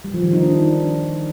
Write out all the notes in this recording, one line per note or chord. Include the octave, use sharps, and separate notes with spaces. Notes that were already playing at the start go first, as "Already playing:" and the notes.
G3
F3
D#3
D#4
D4